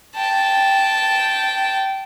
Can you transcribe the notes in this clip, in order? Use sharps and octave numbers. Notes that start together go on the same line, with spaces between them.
G5 A5